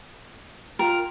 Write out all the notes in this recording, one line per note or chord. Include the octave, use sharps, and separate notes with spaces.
F4 A#4 G5